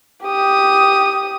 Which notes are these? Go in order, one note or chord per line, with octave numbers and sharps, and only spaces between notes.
G4 D#6